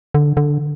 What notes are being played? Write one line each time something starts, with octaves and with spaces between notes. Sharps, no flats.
D3
D3